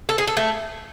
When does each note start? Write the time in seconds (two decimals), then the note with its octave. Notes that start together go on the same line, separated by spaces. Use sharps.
0.09 A4
0.18 G#4
0.27 A4
0.37 A3